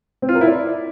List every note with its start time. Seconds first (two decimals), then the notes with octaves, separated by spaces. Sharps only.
0.22 C4
0.29 F4
0.35 A#4
0.41 E4
0.47 D5